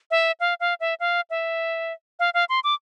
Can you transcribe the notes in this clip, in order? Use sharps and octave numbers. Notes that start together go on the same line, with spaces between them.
E5
F5
F5
E5
F5
E5
F5
F5
C6
D6